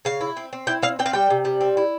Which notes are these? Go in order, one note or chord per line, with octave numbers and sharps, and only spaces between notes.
C#3 F5
E4
C4
C4
E4 G5
C4 F5
C4 G5
F5
G3 G5
C3
G3
C4
E4